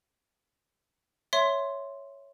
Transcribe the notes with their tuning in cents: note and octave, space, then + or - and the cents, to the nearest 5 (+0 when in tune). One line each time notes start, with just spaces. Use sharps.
C#5 +0 E5 +0 C6 +0